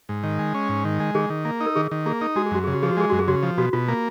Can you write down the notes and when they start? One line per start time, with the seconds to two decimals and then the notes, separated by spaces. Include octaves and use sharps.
0.09 G#2
0.23 D#3
0.39 G#3
0.55 C#4
0.69 G#2
0.85 D#3
1.00 G#3
1.15 D#3 G#4
1.30 D#3
1.45 A#3
1.60 D#4
1.66 A#4
1.75 D#3 G#4
1.91 D#3
2.06 A#3 G#4
2.21 D#4
2.36 G#3 F#4
2.46 G#4
2.51 F#2 F#4
2.64 C#3 G#4
2.73 F#4
2.82 F3 G#4
2.91 F#4
2.97 G#3 G#4
3.10 F#2 F#4
3.19 G#4
3.28 C#3 F#4
3.43 F3
3.58 B2 F#4
3.73 B2 F4
3.88 A#3